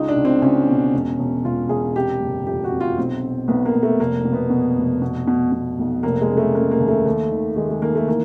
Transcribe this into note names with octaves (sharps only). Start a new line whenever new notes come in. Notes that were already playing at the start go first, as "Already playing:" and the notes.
Already playing: C#2 D#4
D4
C#2
C4
C#2 C#4
B2
E1
E1
E1 F4
E1 G#4
C3 G4
F#1
F2 G4
F#4
C3
F4
B1 C4
B2
B1 B3
A#3
B1
A3
F1 A#3
B2
B3
B2
F1
B2
B2
B2
B1
F1 A#3
G#3
C#3
A3
C#3 A#3
A#3
D#2
A3
D#2
D#3
D#3 G#3
G#3
D#3 A#3
A3
E3 A#3